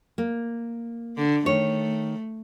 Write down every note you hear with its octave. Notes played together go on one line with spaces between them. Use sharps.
A#3
D3
D#3 A3 C#5